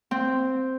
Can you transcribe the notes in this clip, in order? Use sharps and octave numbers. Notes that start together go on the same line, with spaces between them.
C4